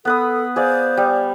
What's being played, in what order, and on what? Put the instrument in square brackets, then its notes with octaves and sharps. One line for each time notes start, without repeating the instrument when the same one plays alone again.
[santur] B3 B4 D#6 [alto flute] A4
[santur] G#4 D5 F5 [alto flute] C5
[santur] G3